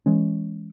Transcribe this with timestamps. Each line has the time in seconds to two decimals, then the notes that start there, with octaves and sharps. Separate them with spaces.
0.06 E3 G#3 C#4